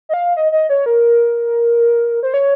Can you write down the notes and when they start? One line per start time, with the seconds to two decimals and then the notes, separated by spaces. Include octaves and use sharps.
0.09 D#5
0.14 F5
0.37 D#5
0.52 D#5
0.69 C#5
0.86 A#4
2.23 C5
2.34 C#5